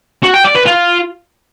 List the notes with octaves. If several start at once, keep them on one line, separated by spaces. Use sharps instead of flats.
F#4
G5
D5
B4
F4